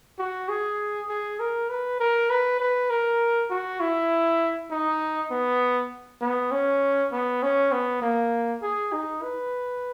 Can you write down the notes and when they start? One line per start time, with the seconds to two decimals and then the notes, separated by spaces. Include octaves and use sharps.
0.19 F#4
0.49 G#4
1.09 G#4
1.40 A#4
1.69 B4
2.00 A#4
2.30 B4
2.60 B4
2.90 A#4
3.50 F#4
3.80 E4
4.71 D#4
5.31 B3
6.21 B3
6.52 C#4
7.12 B3
7.43 C#4
7.72 B3
8.02 A#3
8.62 G#4
8.93 D#4
9.23 B4